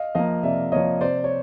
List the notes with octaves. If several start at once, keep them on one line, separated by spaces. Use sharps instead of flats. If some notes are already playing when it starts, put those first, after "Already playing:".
Already playing: D#5 F5
F3 A#3 D#5 F5
C3 D5 E5
F3 A#3 C#5 D#5
C3 C5 D5
C#5